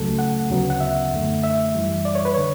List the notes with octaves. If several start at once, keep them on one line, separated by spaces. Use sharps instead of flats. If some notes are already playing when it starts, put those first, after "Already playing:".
Already playing: C#2 C#3 F#3 A3 A4
F#5
D2 C#3 F#3 B3
F#5
E5
F#2 D3 A3
E5
F#2 E3 G3
D5
C#5
B4
D3 C#5